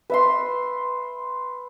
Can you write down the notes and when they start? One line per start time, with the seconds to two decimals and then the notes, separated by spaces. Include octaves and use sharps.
0.10 B4 E5 C6